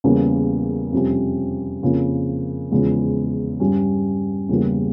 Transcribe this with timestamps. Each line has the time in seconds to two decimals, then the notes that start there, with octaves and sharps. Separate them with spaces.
0.04 E2 C#3 G3 A#3 C#4
0.93 F2 C3 G3 C#4 G4
1.83 F2 C#3 F3 A#3
2.71 E2 C#3 F3 G#3
3.60 G2 G3 C#4
4.49 E2 C#3 G3 A#3